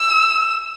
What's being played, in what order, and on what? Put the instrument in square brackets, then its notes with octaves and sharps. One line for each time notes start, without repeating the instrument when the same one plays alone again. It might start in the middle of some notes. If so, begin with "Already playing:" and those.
Already playing: [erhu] E6